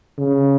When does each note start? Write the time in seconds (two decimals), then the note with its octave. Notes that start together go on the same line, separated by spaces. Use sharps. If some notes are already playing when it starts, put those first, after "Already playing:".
0.19 C#3